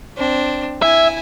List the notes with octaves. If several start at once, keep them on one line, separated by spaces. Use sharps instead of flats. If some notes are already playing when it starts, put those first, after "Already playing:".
C4 D4
E4 E5 G#5